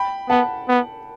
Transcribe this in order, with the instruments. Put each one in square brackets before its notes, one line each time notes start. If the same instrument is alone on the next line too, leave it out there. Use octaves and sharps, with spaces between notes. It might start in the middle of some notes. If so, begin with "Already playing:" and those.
Already playing: [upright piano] G5 B5
[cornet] B3 [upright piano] F#5 A5
[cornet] B3